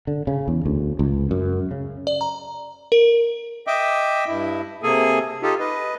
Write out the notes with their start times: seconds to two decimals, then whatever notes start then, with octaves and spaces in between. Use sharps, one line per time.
0.07 D3
0.27 C#3
0.48 E2
0.66 D2
0.99 C#2
1.31 F#2
1.71 C#3
2.07 D5
2.21 A#5
2.92 A#4
3.67 D#5 E5 G5 D6
4.28 G2 E4
4.83 C3 A#3 G#4 A4 G#5
5.42 D#4 F4 G4 A4
5.59 B4 D#5